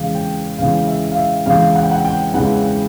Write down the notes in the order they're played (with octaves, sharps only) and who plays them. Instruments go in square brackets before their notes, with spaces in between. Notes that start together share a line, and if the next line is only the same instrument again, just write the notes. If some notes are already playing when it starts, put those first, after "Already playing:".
Already playing: [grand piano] E2 C#3 E3 G#3 F5
G5
E2 C#3 E3 G#3 F5
E5
F5
E5
E2 C#3 E3 G#3 F5
F#5
G5
F#5
G5
E2 C#3 E3 G#3 F#5